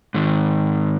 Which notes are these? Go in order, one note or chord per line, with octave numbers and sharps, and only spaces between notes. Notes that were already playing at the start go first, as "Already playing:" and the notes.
G#2 D#3